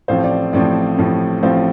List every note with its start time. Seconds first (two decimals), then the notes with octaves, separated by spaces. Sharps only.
0.08 A1 A2 F3 C4 C5 F5
0.24 D5
0.53 A1 A2 F3 C4 D5
0.98 A1 A2 F3 C4
1.43 A1 A2 F3 C4 C5 F5